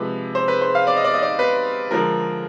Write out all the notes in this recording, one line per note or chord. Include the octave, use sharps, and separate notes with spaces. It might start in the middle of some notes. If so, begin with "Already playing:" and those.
Already playing: C3 F3 G#3 B4
C5
B4
C5
F5
D5
D#5
D5
D#5
D5
B4
D3 F3 G#3 A#4